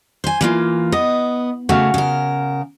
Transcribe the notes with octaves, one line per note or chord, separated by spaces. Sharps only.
C5 G#5
E3 A#3 F4
B3 D#5
C#3 A3 F#4 F5
C#3 A#4